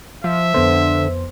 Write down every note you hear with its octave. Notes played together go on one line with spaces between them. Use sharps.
F3 E5
F2 D3 B3 C5